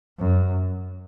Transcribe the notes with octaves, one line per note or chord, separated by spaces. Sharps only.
F#2